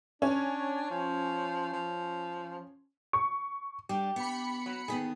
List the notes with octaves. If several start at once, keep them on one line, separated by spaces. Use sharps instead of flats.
C#4 D4
F3
F3
C#6
G3 D4 G4
B3 B5 C#7
F#3
D3 D#3 B3 G#4